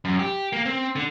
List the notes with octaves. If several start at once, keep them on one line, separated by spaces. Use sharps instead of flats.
F#2
G4
A#3
C4
D3